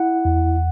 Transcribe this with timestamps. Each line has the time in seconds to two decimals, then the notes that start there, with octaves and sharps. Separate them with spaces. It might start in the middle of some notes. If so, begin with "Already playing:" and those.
Already playing: E4 F#5
0.25 E2